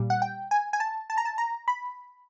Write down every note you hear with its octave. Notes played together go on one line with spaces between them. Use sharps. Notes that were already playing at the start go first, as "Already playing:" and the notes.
Already playing: A#2 G3
F#5
G5
G#5
G#5
A5
A5
A#5
A5
A#5
B5